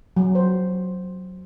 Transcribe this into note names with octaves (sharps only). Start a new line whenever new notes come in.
F#3
C5